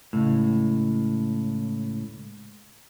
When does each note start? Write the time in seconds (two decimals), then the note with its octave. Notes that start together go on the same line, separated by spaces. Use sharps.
0.13 C#2 A2